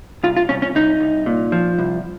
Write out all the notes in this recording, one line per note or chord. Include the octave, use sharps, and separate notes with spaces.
C2 F4
F4
C2 C#4
C#4
C2 D#4
C2
A#2
F3
C2